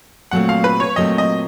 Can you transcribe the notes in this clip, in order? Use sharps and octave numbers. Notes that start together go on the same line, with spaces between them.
A#2 F#3 A3 C4 F#5
F5
B4
C#5
A#2 F#3 A3 C4 D#5
D#5